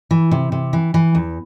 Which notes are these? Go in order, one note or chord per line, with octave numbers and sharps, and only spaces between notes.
E3
C3
C3
E3
E3
E2